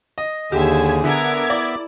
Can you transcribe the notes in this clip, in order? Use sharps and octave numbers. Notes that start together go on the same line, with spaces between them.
D#5
D#2 D3 G4 G#4 E5 G#6
D3 B3 A#4 E5 D6 G#6
E4 D5